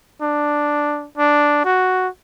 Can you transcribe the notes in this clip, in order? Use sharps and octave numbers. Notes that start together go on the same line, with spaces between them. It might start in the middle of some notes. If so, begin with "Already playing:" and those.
D4
D4
F#4